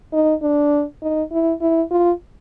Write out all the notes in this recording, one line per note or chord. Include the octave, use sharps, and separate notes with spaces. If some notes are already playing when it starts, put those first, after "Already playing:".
D#4
D4
D#4
E4
E4
F4